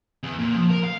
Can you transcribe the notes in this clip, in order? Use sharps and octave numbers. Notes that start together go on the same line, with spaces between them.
E2
A#2
F3
A#4
F5